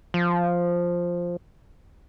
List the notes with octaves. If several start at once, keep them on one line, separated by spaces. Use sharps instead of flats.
F3